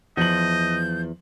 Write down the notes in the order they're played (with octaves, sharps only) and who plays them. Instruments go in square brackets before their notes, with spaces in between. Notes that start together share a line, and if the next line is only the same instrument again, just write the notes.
[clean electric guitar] E2 [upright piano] F3 F#7 [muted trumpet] D#5 [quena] G6